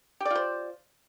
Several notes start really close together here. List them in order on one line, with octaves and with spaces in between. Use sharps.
G4 D5 F4 C5